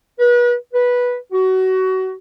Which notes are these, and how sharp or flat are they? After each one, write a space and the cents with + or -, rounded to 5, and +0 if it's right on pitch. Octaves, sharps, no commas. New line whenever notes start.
B4 -35
B4 -10
F#4 +25